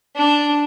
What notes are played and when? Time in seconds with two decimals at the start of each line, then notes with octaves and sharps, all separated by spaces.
0.16 D4